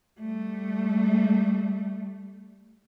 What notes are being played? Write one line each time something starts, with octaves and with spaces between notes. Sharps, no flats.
G3 A3